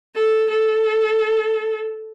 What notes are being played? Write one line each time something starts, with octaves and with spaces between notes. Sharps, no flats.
A4
A4